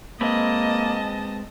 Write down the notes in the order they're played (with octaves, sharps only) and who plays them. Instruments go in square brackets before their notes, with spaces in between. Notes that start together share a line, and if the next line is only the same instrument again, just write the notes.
[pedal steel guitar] G#3 C4 B4 [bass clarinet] A#3 [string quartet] D#5 A5